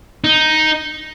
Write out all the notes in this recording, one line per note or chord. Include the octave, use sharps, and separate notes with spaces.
D#4